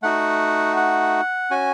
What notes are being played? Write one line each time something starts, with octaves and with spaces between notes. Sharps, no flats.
A3 D#4 F#4 F#5
F#5
C#4 F#4 G#5